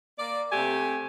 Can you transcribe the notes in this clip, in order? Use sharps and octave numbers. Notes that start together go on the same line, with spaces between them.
A#3 D5
C3 A3 G4 G#5